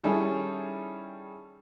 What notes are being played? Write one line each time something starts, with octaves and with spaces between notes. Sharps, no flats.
D#3 G3 C#4 E4 G#4 A4